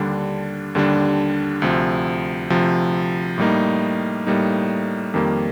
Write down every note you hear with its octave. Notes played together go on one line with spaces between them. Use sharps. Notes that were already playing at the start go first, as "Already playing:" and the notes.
Already playing: D#2 D3 G3 D4
D#2 D3 G3 D4
D2 C3 F3
D2 C3 F3
A2 G3 A#3 D#4
A2 G3 A#3 D#4
F2 D#3 G3 A#3